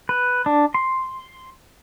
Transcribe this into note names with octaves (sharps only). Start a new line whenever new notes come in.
B4
D4
C6